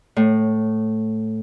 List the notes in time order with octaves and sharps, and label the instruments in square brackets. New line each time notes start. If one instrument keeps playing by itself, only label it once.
[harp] A2